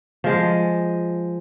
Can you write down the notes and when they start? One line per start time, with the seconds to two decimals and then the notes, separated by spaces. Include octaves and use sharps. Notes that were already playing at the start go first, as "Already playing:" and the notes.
0.24 F3 G#3